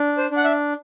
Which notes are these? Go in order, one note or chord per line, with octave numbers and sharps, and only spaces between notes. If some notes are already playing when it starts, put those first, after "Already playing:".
Already playing: D4
C5
D4
F#5
E5